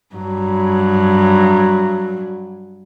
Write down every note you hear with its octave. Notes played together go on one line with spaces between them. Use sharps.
G2 F#3